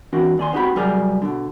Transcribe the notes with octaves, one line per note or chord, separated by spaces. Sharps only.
E3 C4 D4 F#4 A#4
D#2 D5 G#5 C6
B3 C4 D#4 F#4 G4 B5
C3 F#3 G3 G#4 A#4 D5
B2 D3